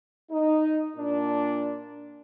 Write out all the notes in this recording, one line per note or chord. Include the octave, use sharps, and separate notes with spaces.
D#4
A#2 D4